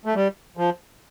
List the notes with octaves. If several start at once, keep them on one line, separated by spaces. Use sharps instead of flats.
A3
G3
F3